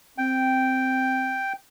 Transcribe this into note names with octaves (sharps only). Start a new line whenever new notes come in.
C4 G5